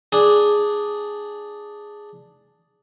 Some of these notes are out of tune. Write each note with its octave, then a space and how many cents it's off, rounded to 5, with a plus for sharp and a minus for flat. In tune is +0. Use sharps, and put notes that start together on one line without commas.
D4 +0 G#4 +0